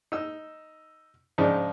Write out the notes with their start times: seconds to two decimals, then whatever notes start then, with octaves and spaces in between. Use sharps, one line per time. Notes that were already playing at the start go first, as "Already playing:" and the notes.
0.12 D#4 E6
1.38 G#2 C#3 F3 D4 D#4